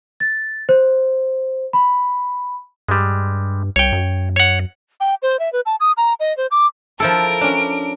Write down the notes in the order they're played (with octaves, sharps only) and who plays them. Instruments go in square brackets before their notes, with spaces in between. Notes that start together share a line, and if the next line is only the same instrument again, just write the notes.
[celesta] A6
C5
B5
[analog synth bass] G2 [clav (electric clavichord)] G3 G#3
[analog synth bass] C2 [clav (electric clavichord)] C#5 G5
[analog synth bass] F#2
[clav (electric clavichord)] C#5 F#5
[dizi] G5
C5
E5
B4
A5
D#6
A#5
D#5
C5
D6
[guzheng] F3 E4 A4 [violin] A#4 D7
[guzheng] C#4 D4